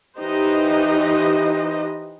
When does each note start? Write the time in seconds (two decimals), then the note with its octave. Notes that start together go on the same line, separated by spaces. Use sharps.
0.18 E3 D#4 G4 B4 C5 D#5